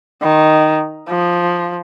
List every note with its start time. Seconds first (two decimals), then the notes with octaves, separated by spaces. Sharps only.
0.22 D#3
1.09 F3